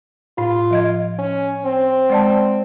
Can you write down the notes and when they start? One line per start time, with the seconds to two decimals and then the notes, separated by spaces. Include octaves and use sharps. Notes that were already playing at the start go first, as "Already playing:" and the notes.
0.38 A2 F4
0.71 F3 D#5 G#6
1.19 C#4
1.66 C4 G5
2.10 G#3 D5 A5